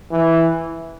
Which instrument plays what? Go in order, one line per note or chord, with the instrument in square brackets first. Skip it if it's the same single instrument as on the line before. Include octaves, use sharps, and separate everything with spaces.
[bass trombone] E3